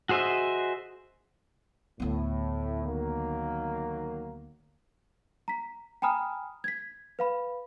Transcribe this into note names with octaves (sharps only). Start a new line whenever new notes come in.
F#4 G#4 C5 D#5 E5
D2 A2 B3
D#3 F#3 A#3
A#5 B6
G5 G#5 A#5 B5 D#6 F6
G#6 B6
B4 F5 B5